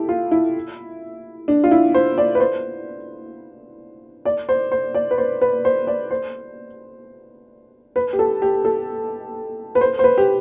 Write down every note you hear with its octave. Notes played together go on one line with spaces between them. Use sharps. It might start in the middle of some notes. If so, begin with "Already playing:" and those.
Already playing: E4 G4 A4
F4
E4
D4
F4
E4
C5
D5
B4
C5
D5
C5
C5
D5
B4
C5
B4
C5
D5
C5
B4
G4
A4
G4
A4
B4
C5
C5
B4
G4